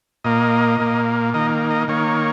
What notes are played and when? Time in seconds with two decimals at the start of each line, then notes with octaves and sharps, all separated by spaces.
0.24 A#2 A#3 D#5
0.80 A#2 A#3
1.34 D#3 A#3 D#5
1.71 D#5
1.88 D#3 A#3 C#5